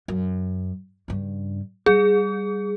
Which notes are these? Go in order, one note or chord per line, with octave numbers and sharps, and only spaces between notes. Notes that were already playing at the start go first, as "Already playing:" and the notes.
F#2
G2 C#3
G3 G#4